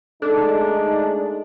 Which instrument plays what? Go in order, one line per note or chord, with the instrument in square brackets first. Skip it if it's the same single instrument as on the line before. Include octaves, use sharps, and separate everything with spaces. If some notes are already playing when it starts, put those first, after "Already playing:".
[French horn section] G#3 A3 D#4 [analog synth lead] D4 [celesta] A4